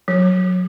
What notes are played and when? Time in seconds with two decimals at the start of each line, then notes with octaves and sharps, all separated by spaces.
0.08 F#3